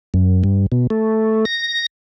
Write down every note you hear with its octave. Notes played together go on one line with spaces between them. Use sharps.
F#2
G2
B2
A3
A#6